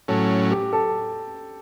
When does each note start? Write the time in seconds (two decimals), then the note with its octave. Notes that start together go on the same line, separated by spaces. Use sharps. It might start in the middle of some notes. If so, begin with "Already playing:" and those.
0.08 A2 F#3 C#4 A4
0.52 G4
0.73 A4